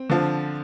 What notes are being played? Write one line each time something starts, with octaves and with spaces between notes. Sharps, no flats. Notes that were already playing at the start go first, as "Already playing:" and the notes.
Already playing: C4
D3 F3